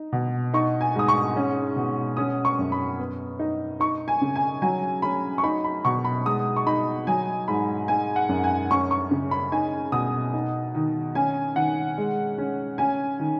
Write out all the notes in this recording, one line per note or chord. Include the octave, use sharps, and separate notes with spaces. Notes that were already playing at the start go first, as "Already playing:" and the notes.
Already playing: D#4
B2
D#4 C#6
G#5
G#2 D#6
C#6
C#4
B2
C#4 D#6
C#6
F#2
B5
B3
D#4
D#4 C#6
G#5
C#3
G#5
F#3 G#5
C#4 B5
C#6
D#4 B5
B5
B2 C#6
B5
G#3 D#6
C#6
D#4 B5
F#3 G#5
G#2 B5
D#4 G#5
F#5
F#2
G#5
C#4 C#6
C#6
C#3
B5
D#4 G#5
B2 D#6
D#4
D#3
C#4 G#5
D#3 F#5
G#3
C#4
C#4 G#5
D#3